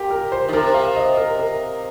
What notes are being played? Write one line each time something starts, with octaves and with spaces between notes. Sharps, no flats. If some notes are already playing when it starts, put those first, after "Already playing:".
Already playing: A#2 G4 A#4
A#4
C5
D#3
C3 A#4
F5
D#5
A#4
A#4